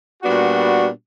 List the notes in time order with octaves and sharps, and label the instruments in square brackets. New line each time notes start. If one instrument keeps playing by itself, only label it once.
[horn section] A#2 G3 B3 D4 F#4